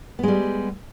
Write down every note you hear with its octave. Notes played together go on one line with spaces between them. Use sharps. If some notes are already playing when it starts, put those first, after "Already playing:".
G3 G#3 B3